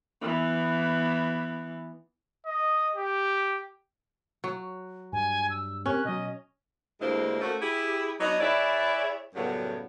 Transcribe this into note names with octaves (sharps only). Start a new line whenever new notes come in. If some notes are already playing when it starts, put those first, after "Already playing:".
E3 B3
D#5
G4
F#3
G2 G#5
E6
C4 C#4 G4 A#4 F#6
B2 F#3 D#5
D2 G2 G#3 A#3 E4 C5
A3 A#3 C#4 F#4 A4 C5
E4 G4 G#4
F#3 B3 D4 D#4
E4 G#4 B4 C#5 D5 E5
F#2 A2 C#3 F#3 G3 B3